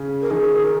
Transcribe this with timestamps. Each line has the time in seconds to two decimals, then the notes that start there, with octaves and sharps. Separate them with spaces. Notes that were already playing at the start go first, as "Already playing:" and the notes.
Already playing: C#3 C#4
0.21 A#4
0.31 D#3 D#4 G#4
0.64 A#4